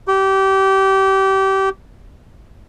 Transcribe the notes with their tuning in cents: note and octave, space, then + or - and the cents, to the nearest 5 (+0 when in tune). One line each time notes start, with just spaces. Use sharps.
G4 -25